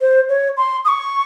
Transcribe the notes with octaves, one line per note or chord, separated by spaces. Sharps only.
C5
C#5
C6
D#6
C#6